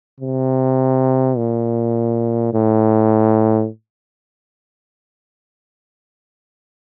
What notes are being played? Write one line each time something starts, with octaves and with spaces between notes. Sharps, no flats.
C3
A#2
A2